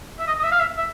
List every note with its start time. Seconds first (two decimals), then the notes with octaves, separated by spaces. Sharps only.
0.19 E5
0.27 D#5
0.39 D#5
0.43 E5
0.52 F5
0.60 E5
0.77 E5